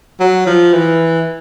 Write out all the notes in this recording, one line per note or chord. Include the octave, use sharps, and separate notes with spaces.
F#3
F3
E3